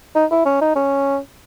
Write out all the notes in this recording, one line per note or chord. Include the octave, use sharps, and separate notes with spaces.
D#4
E4
C#4
D#4
C#4